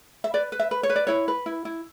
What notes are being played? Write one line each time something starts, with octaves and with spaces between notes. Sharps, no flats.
E5
B4 D5
B4
E5
B4
C#5
B4
D5
E4 C#5
B4
E4
E4